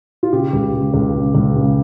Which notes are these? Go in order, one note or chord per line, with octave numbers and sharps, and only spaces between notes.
F4
C#3 G4
C#2
C#3
C#2
C#3
C#2
C#3